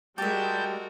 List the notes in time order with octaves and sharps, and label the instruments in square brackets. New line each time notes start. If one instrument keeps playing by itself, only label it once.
[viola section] G3 G#3 [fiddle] F#4 A#4 [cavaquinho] G4 E5 [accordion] A5 G6